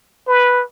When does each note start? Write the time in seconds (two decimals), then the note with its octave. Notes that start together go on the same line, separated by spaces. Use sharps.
0.28 B4